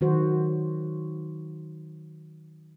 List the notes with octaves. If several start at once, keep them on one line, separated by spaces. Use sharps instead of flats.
D#3 F#3 F#4 C5